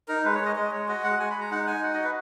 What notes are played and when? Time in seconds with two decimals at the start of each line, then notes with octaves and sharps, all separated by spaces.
0.08 D#4 A#4
0.24 G#3 B4
0.35 C#5
0.40 G#3
0.46 D#5
0.56 G#3 D#5
0.72 G#3 C#5
0.88 F#4 D#5
1.04 G#3 F#5
1.19 G#3 G#5
1.30 B5
1.35 G#3
1.41 A#5
1.51 D#4 F#5
1.67 D#4 G#5
1.83 F#4 F#5
1.94 D#5
1.99 F#4
2.04 B4